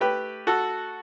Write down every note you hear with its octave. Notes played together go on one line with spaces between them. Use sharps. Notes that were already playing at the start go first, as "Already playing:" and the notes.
A3 G4 B4
F#4 A4